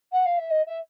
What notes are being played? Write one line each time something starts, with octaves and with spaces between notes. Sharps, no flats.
F#5
F5
E5
D#5
E5